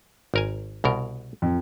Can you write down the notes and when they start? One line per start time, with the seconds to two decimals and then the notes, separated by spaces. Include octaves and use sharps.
0.34 G#1 A#4 G#5
0.84 C2 B2 A#4
1.42 F2